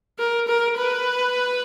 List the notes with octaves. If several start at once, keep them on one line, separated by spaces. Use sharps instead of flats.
A#4
A#4
B4